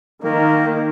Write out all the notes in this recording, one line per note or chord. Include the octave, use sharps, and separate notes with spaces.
D#3 A#3